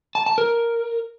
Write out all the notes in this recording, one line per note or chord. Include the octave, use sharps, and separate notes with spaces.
A5
A5
A#4